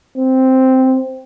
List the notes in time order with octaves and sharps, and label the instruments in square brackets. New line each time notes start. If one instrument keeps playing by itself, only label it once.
[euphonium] C4